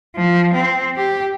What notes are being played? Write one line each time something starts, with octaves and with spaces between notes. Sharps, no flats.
F3
C4
G4